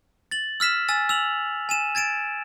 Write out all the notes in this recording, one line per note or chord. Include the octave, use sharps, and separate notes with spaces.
A6 F#7
E6 F6 B6 E7
G#5 E6 A6
E6 F7 F#7
G#5 D#7 E7
G#6 A6 D7 E7